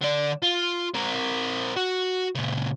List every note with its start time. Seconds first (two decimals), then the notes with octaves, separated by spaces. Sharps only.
0.01 D3 D5
0.42 F4
0.94 C4 A#4
1.76 F#4
2.35 A#2 C#3